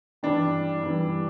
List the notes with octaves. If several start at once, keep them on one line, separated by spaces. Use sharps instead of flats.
G2 E3 G3 D4
G2 E3 G3